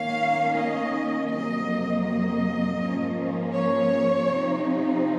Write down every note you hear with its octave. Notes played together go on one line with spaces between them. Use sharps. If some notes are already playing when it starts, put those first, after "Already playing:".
Already playing: D#3 A#3 C#4 F5
D#5
F2 C3 F#3 A#3 D#5
D#5
G#2 F3 A#3 C#4
C#5
C3 F3 C4 D#4